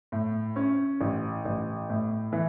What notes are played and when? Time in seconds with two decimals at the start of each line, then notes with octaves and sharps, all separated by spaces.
0.12 A2
0.56 C#4
1.01 A1
1.45 A1
1.90 A2
2.33 E3